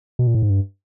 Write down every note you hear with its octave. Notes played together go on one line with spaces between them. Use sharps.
B2
A#2
A2
G#2
G2